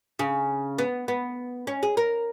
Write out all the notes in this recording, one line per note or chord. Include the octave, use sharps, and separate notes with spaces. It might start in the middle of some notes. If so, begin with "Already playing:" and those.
C#3
B3
B3
C#4
G#4
A#4